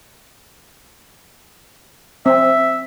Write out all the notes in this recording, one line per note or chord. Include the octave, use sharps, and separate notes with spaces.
C4 E5